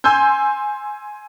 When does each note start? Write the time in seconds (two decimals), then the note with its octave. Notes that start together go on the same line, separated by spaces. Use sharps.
0.04 G#5 C6 E6 G6